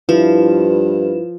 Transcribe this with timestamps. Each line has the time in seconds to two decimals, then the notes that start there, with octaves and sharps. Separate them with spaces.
0.09 G2 F3 E4 B4